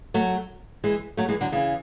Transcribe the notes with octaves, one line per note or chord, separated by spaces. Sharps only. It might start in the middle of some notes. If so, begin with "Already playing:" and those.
F#3 A3
E3 G#3
F#3 A3
E3 G#3
D3 F#3
C#3 E3